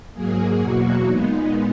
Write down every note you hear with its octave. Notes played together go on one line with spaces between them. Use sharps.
G#2 F#3 A#3 G#4
E2 B2 F#3 A#3 F#4
A#2 G#3 B3 D#4